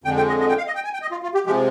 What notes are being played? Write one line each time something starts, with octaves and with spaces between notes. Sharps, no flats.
F2 D3 G#3 G5
G5
D#5
D#5
G5
F5
D#5
G5
G#5
G5
D#5
F4
F4
G4
C3 F3 G#3 G4